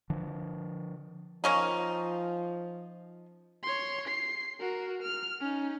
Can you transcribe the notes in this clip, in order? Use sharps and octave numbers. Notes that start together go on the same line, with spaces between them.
D3 F3
F3 A#3 C#4 D#4
C#5 C6
C7
F#4 A#4
F6
C#4 D#4